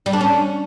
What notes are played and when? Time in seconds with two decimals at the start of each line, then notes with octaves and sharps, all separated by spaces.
0.06 G3
0.13 D4
0.21 C#4